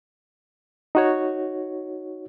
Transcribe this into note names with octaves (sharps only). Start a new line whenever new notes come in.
D#4 F#4 C#5